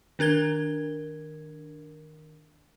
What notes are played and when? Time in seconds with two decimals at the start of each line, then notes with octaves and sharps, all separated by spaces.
0.19 D#3 D4 A#4 G#6 G7